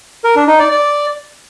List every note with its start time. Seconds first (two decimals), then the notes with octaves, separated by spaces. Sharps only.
0.24 A#4
0.36 D4
0.48 D#4
0.60 D5
0.71 D5